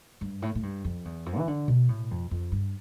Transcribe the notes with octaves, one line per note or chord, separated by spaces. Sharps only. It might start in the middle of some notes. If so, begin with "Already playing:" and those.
G2
A2
A2
G2
F2
E2
F2
E3
D3
B2
A2
F2
F2
G2